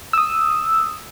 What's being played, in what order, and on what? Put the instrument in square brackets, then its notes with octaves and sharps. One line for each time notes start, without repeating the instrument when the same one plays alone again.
[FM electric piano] D#6 E6